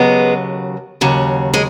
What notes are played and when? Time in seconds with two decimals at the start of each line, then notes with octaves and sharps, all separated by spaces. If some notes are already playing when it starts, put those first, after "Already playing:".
Already playing: D#2 C#3 F#3 G#3 B3
1.01 D#2 C#3 F#3
1.54 G#3